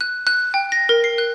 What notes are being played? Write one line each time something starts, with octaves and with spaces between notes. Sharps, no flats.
F#6
F#6
G5
A#6
A#4
C7
F#6